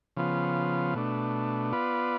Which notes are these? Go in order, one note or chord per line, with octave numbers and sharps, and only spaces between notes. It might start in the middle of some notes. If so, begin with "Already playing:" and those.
C#3 F3 B3 F4
B2 A3 D4
B3 F4 B4 D5